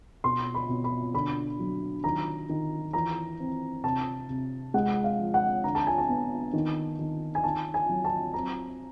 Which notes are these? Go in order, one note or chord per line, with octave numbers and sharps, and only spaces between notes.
B2 C6
B5
B2
B5
D3 B5
F#3
D#3 A#5
D#3
E3 A#5
C4
C3 A5
C3
G#3 F#5
F5
F3
F#5
D3 A#5
A5
G#5
A5
B3
D#3
D#3
G#5
D#3 A5
G#5
F#3
A5
C4 A#5